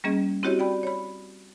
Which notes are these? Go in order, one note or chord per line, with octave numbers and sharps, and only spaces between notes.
G3 A#3 C#4 G#4 D#5
C4 E4 F#4 G4 C#5 D#5
D5 G5 B5
C#5 B5